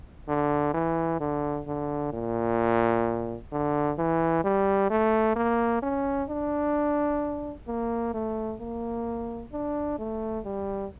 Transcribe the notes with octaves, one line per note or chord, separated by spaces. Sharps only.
D3
E3
D3
D3
A#2
D3
E3
G3
A3
A#3
C#4
D4
A#3
A3
A#3
D4
A3
G3